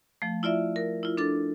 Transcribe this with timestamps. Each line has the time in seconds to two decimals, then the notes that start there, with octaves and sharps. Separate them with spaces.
0.22 F3 A3
0.43 E4 F4 D5 E5
0.76 A#4
1.03 E4 F4
1.17 D4 A4 D6 A6